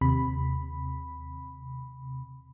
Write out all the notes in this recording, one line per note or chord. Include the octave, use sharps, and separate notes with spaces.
D#2 C3 B5